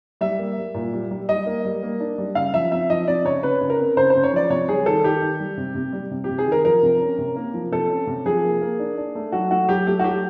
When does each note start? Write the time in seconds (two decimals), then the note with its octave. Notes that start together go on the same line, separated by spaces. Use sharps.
0.21 G3 E5
0.39 A#3
0.58 G3
0.74 A#2
0.93 G3
1.11 G3
1.29 G3 D#5
1.46 A#3
1.65 G3
1.83 A#3
2.00 D4
2.18 G3
2.35 C#3 F5
2.54 F3 E5
2.71 C4 E5
2.90 F3 D#5
3.07 C4 D5
3.25 C#3 C#5
3.43 C#3 B4
3.61 C#3
3.70 A#4
3.79 C4
3.97 C#3 C5
4.10 C5
4.15 C#3
4.23 C#5
4.33 F3 D5
4.50 C3 C#5
4.68 G3 G#4
4.86 D#3 A4
5.04 D#3 G4
5.22 D#3
5.40 G3
5.57 C3
5.75 C3
5.93 G3
6.11 C3
6.24 G4
6.29 C3
6.38 G#4
6.46 D#3
6.52 A#4
6.65 F3 A#4
6.83 C3
7.00 C#4
7.19 C3
7.36 A#3
7.54 F3
7.72 C3 A4
7.90 C#4
8.07 C3
8.26 F3 G#4
8.44 A#3
8.61 A#3
8.79 D4
8.97 D4
9.15 A3
9.32 F#3 F#4
9.51 A3 F#4
9.69 F#3 G4
9.87 A3 G4
9.99 F#4
10.04 F#3 G4